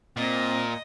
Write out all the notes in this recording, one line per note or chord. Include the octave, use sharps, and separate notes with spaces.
A#2 C4 D#5